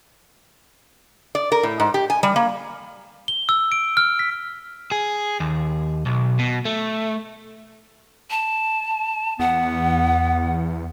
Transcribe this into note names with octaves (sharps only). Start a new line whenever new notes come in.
D5
A#4
A2
G#2
G4
G#5
G3
A#3
G7
E6
D7
F6
B6
G#4
D#2
B1
B2
A3
A5
E2 B3 F#5